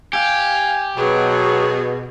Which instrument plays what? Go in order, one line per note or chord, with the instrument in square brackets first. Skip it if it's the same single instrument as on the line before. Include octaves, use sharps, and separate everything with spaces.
[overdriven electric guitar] G4 [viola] F5 [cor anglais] G#5
[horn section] B2 [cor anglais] F#3 [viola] G#4